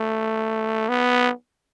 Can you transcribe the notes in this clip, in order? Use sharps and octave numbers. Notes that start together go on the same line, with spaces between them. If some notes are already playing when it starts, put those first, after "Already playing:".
Already playing: A3
B3